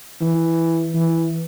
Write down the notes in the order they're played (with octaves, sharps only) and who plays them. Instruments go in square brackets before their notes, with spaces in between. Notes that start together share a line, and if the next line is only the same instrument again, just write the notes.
[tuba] E3
E3